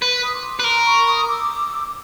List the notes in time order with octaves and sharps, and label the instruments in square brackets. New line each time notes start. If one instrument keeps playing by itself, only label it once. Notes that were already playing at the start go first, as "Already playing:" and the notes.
[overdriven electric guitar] B4
[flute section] D#6
C6 D6
[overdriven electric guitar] B4
[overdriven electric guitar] A#4 [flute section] A#5 C6
[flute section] B5 C#6
C#6 D#6
D6 E6